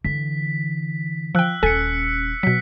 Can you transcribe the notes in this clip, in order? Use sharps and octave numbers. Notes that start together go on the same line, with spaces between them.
D3 E3 B6
F3 G5 E6 F#6
D#1 C#4 A4 G#5 B6 C#7
B2 F#3 B6